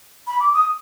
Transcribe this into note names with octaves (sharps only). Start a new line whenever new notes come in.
B5
D6
D#6